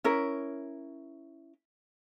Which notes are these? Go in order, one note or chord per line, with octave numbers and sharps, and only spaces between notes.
C#4 E4 A#4